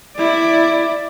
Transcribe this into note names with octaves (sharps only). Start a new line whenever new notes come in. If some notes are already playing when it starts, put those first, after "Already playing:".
E4 D5